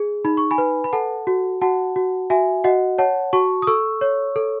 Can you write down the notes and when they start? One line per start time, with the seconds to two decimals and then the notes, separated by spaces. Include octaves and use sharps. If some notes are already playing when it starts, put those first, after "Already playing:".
Already playing: G#4
0.25 D#4 B5
0.37 C#6
0.51 G#5 B5
0.58 B4
0.84 B5
0.93 A4 F#5 A5
1.27 F#4
1.61 F#4 F#5 A5
1.96 F#4
2.30 F#4 E5 G#5
2.64 F#4 D#5 F#5
2.98 C#5 F#5 A5
3.33 F#4 A5 C#6
3.62 D#6
3.67 A4 C#6 E6
4.01 C#5
4.36 A4